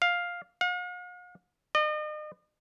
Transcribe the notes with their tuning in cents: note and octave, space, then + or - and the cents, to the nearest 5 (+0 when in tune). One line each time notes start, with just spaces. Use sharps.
F5 +5
F5 +45
D#5 -40